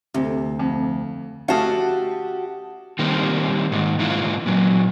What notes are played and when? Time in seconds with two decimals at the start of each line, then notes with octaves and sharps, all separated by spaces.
0.14 D2 C3
0.59 F2
1.48 A3 C#4 F#4 G4 F5 F#5 A5 D#6
2.99 D#3 G3 A#3 C4
3.72 G#2 D#3
3.99 G#2 E3 A#3 F4
4.46 A#2 F#3